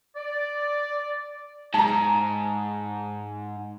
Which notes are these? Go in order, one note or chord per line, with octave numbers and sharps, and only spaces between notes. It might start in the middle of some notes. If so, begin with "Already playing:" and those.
D5
G#2 A5 A#5